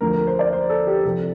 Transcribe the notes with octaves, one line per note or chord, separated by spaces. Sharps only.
D2 D3 F3 A#4
A#4
C5
D5
C5
A4
G4
C2 C3 F3 A4